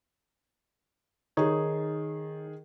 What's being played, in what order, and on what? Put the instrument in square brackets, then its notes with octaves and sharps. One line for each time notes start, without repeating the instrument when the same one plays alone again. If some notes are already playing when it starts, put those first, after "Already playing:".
[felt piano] D#3 G#4 [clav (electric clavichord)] D#4 C#5